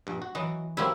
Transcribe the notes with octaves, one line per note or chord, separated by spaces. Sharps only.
A#1 G2
F#4
E3 F#3 F#4 D#5
G2 F#3 A#3 C4 E4